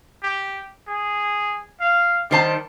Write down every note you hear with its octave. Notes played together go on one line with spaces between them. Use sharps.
G4
G#4
F5
D#3 G3 C5 A5